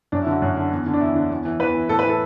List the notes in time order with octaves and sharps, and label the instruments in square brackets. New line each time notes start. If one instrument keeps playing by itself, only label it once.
[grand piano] F#2 D4
E4
D3
F#4
F#2
D3
E2
D3
D4
E2 E4
D3
E2
E3
E2 B4
E3
A2 A4
B4
E3
A4